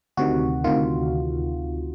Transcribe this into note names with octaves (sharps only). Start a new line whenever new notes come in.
D2 C3 D#3 F#4
D2 C3 D#3 F4